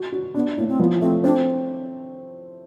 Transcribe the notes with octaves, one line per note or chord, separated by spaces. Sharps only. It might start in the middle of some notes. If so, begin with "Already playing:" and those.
Already playing: F#4
F#4
B3 D4
A2 A#3
C4
F3 B3
A3 C4
C4 D4